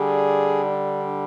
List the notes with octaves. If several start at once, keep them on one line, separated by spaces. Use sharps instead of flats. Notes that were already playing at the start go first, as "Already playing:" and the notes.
Already playing: D3 G3 G#4
D4